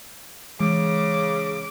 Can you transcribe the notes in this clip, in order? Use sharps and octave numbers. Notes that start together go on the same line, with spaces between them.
C#3 E3 G#3 D6